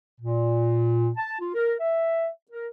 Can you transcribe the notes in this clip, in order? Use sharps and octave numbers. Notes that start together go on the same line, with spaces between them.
A#2
A5
F4
A#4
E5
A#4